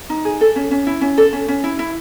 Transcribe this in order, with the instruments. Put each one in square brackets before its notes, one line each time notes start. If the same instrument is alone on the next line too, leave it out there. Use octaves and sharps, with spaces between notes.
[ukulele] D#4
G#4
A4
C#4
C#4
E4
C#4
A4
C#4
C#4
E4
E4